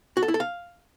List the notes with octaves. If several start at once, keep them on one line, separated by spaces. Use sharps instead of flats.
F#4
A4
E4
A4
F5